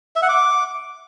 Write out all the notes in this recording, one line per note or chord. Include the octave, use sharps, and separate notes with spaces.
E5
F#5
D6